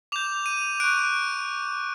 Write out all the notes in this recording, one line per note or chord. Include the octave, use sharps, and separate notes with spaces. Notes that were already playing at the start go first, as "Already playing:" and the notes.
D6 G6 F7
D#7
C#6 F#6 D7